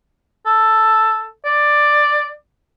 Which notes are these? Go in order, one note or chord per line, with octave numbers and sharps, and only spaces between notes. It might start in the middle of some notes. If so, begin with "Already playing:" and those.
A4
D5